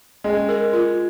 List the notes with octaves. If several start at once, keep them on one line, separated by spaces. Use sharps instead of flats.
G#3 C#4
A#4
F4